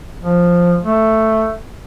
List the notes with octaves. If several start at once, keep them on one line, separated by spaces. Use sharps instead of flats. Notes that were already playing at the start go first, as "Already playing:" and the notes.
F3
A3